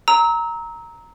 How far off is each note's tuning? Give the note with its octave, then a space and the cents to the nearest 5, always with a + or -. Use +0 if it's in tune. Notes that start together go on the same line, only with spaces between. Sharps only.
A#5 +0 E6 -35